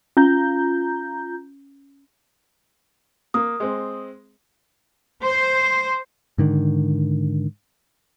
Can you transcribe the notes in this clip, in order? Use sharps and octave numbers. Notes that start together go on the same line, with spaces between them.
C#4 F4 A#5 G6
A#3 D#6
G#3 C4
C5
G#2 D3 D#3